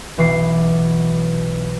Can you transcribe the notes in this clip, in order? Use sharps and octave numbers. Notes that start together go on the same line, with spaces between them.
B1 E3 F#4 D6 C7